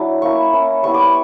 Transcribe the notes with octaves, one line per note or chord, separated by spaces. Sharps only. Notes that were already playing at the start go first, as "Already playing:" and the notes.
Already playing: F#3 D4 E4
A#3 C#4 E4 C#6
A#3 C#4 E4
G3 B3 E4 C#6
D6
C#6